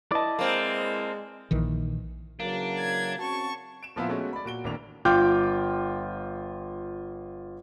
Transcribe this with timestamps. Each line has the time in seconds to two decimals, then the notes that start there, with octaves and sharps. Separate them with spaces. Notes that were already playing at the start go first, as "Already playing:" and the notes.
0.12 E4 B4 D5 D#5 A5
0.39 G#3 A#3 C4
1.51 A#1 D#3 E3
2.40 C#3 E3 F#3 A#3 D4
2.77 G#6
3.18 C4 C#4 F#4 A5 C#6
3.83 D7 E7
3.96 A#2 F3 B3 C4 E4 F4
4.09 G#3 A3 B3 C#4 F#4
4.33 D5 B5
4.45 A#2 F#4 D7 G7
4.64 G#1 A2 A#3 D4 F7
5.05 G1 F4 G5 D6 F6 G6